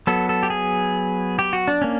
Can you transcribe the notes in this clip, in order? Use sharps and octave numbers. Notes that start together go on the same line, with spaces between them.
F#3 B3 A4
A4
G4
G#4
G4
F#4
D4
A#3 C#4